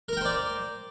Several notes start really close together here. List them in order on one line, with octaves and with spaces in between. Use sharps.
A#4 A#5 G5 C5 D5